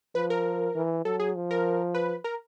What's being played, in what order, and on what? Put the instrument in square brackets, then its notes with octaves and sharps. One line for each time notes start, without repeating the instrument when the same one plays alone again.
[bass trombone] F3 [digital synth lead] B4
[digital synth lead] A#4
[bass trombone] E3
[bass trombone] F#3 [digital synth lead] A4
[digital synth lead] G#4
[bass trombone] F3
[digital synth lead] A#4
B4
A#4